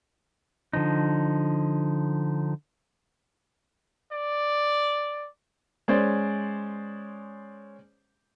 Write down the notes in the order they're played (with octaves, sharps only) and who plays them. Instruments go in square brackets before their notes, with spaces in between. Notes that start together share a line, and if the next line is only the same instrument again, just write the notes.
[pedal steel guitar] D3 F3 D#4
[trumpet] D5
[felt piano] G#3 C#4 C5 D5